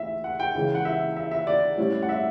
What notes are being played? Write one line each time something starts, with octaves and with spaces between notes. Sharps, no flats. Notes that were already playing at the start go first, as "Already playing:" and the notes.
Already playing: D2 E3 E5
F#5
G5
C#2 C#3 E3
F#5
E5
E5
E5
D5
A2 G3 C#4 E4
F#5
E5